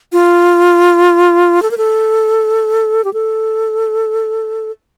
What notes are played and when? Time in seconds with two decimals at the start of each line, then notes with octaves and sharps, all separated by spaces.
0.13 F4
1.62 A4
1.71 A#4
1.78 A4
3.04 G4
3.13 A4